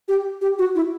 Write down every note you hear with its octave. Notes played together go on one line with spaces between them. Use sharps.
G4
G4
F#4
E4